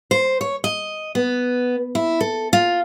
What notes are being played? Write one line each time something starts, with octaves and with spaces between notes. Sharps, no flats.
C5
C#5
D#5
B3
E4
A4
F4